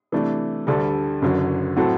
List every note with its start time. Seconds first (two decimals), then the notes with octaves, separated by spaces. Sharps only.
0.12 C3 E3 A3 D4
0.67 D2 D3 G3 D4 A4
1.22 F#1 F#2 D3 F#3
1.76 A2 F#3 C4 F#4 A4